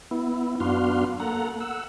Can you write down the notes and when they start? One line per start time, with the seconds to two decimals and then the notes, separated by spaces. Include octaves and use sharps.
0.11 B3 E4
0.60 F#2 B3 D4 F#4 F5 C6
1.20 A#3 A4 F#5 A#5
1.60 F#5 E6